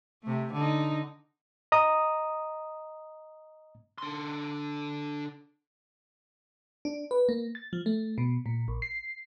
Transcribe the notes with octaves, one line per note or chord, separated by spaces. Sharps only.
C3 A3
D3 D#4
D#5 A#5 D#6
D3 C6
D4
B4
A#3
A6
F3
A3
B2
A#2
A#1
C7